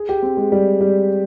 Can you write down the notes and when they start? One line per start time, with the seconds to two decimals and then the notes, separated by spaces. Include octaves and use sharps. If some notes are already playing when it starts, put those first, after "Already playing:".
Already playing: G#4
0.09 G4
0.22 C4
0.37 G#3
0.52 G3
0.81 G3